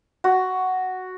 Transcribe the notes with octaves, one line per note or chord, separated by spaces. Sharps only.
F#4